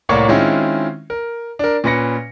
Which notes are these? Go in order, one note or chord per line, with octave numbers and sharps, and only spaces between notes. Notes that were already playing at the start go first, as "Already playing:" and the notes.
C2 A2 A#3 C#5 D5 C#6
D#3 G#3 C4 C#4 E4 F4
A#4
D4 A#4
A#2 C#4 B4 A#6 C#7